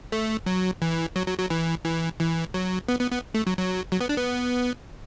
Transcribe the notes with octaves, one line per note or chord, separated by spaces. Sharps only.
A3
F#3
E3
F#3
F#3
F#3
E3
E3
E3
F#3
B3
B3
B3
A3
F#3
F#3
F#3
B3
D4
B3